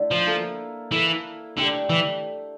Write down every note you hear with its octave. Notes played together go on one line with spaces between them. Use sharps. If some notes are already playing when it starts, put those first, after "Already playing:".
Already playing: D3 A3 E4
F3
A#3 E4 A4
E3 A#3 E4 A4
D3 A3 D4 G4
E3